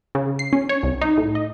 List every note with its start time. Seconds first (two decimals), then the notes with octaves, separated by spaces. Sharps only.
0.15 C#3
0.39 C7
0.53 C#4
0.69 C#5
0.83 C2
1.02 D#4
1.17 A2
1.35 D#5